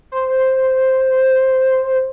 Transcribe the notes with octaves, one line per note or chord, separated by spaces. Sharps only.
C5